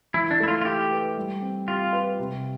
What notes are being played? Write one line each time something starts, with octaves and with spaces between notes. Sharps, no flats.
E3 E4
D4
A3 E4
F4
F4
E4 G4
B4
G3
C4
F4 G4
B4
C3